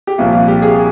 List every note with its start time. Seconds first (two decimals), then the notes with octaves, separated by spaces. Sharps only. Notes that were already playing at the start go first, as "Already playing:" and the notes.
0.07 G4
0.18 C2 A#2 F3 F4
0.33 F4
0.48 G4
0.62 G#4